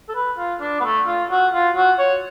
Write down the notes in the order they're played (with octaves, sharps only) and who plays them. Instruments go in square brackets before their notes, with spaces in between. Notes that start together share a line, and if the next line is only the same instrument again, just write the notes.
[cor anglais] A4
B4
F4
D4
B3
A3
F4
F#4
F4
F#4
C#5